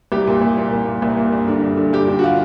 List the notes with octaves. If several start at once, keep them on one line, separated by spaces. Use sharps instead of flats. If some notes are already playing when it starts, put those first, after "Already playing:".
C2 G4
A#2
C2
A#2
C2
A#2
C2
A#2
G2
D3
G2
D3
G2 G4
D3
F#4
F4